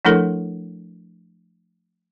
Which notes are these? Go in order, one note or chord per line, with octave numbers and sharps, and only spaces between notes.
F3 A3 D4 E4 A4 A#4